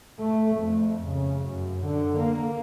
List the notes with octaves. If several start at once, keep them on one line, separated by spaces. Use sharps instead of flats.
A3
F2
C#3
F#2
D3
A#3